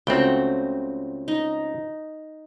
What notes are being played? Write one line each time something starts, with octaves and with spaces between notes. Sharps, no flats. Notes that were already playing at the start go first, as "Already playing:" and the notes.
C#2 A3 C4 F#4 G5
D#4